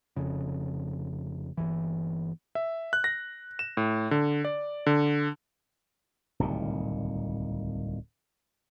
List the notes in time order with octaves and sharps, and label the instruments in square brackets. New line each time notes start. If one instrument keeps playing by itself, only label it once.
[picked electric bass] F1 F2 C#3
G1 C#2 E3
[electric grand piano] E5
F#6
A#6
E7
A2
D3
D5
D3
[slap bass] D1 C2 A#2 D#3